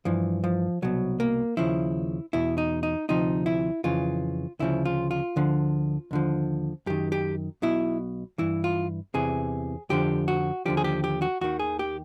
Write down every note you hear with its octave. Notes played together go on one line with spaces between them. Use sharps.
G2 E3 F3
F3
C2 B2 F#3
A#3
D#2 C#3 F3 E4
E2 B2 E4
D#4
D#4
D2 C3 F3 D#4
E4
F2 C#3 E3 F4
D2 C#3 F3 E4
F4
F4
D2 D3 F3
D#2 D3 F3
F#2 D#3 G4
G4
B1 B2 E4
G2 E3 E4
F4
E2 C3 E3 G#4
F2 D3 F3 G4
F#4
D#2 D3 F3 G4
G#4
G4
G4
F#4
D#2 D#3 F#4
G#4
G4